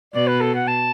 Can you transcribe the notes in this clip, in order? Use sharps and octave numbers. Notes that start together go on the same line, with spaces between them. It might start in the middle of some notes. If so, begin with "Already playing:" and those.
B2 D5
B4
A4
F#5
A5